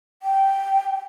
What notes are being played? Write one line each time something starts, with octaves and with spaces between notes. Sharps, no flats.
G5